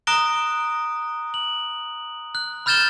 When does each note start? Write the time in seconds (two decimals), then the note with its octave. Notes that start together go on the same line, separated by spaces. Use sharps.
0.07 A#5 D#6 F#6 A#6 D7 G7
1.34 F#7
2.35 F#6
2.66 B5 F6 G6 A6 E7 G7